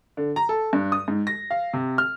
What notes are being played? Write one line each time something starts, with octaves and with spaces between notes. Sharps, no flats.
D3
A#5
A4
G2
D#6
G#2
A#6
F5
C3
F6